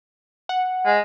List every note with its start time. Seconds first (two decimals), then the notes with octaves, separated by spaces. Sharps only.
0.49 F#5
0.86 G#3